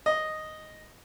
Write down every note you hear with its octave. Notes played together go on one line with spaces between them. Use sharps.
D#5